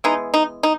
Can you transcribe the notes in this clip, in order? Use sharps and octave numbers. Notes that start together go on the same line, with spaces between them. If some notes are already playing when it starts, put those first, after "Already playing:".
E3 G#3 B3 D#4
D#4
D#4